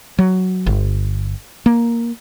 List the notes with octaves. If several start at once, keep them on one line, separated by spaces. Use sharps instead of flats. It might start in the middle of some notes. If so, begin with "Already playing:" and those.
F#3
G1
A#3